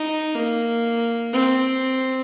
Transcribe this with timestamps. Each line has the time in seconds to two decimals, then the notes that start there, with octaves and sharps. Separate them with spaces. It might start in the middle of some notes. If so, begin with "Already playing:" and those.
Already playing: D#4
0.35 A#3
1.33 C4